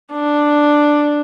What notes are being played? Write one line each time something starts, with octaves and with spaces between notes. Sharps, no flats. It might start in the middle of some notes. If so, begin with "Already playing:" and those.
D4